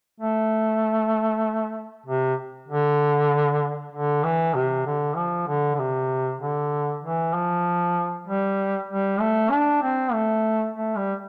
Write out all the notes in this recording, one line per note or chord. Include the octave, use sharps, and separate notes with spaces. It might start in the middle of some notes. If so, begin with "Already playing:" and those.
A3
C3
D3
D3
E3
C3
D3
F3
D3
D3
C3
D3
E3
F3
G3
G3
A3
D4
C4
A3
A3
G3